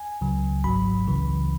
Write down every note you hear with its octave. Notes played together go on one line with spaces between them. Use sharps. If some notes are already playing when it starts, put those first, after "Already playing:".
Already playing: G#5
C#2 C#3 F#3
G#1 G#2 F#3 B5
C#2 C#3 E3